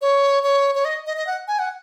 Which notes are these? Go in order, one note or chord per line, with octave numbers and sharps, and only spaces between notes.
C#5
C#5
C#5
D#5
D#5
D#5
F#5
G#5
F#5